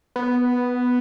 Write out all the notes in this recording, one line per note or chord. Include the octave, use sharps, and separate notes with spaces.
B3